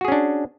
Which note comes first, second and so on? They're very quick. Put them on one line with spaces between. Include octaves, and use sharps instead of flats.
F#4 G#4 C#4 D4